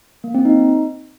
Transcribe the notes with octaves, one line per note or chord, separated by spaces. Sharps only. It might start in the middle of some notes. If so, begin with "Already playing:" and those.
A#3
C4
D#4